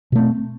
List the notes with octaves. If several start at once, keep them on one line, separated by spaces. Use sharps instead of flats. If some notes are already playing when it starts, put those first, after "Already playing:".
B2 A3 C4